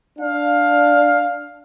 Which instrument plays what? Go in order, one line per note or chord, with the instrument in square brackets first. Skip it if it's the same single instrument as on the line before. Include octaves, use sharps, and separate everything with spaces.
[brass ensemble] D4 F5